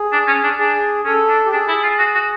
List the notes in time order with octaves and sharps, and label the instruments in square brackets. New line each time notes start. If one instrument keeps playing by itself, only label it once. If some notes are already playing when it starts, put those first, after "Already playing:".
Already playing: [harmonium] G#4
[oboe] D4
C#4
D4
[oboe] D4 [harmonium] G#4
[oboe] C#4 [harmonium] A4
[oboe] D4
[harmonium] G4
[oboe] D4 [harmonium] G#4
[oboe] E4
F4
F#4
F#4